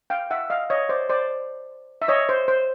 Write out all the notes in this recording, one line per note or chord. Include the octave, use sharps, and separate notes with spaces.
F5 G5
E5 F#5
D#5 F5
C#5 D#5
C5 D5
C5 D5
E5
C#5 D#5
C5
C5